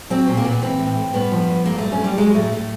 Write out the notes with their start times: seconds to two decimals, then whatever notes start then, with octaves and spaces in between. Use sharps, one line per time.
0.10 F#3 C4
0.27 A#2 C4
0.37 A#3
0.44 A#2 B3
0.62 E3 C4
0.79 A2
0.96 A2
1.14 G2 B3
1.32 F3
1.49 G2
1.66 G2 A#3
1.78 F#3 A3
1.92 C#4
1.99 G2 G3
2.18 F#3 G#3
2.34 A2 A3
2.52 A2 A3